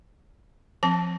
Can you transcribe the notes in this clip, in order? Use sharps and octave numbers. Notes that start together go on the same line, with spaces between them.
F3 C4 A5